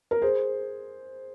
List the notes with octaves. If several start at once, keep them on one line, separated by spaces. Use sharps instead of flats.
A#4
G#4 C5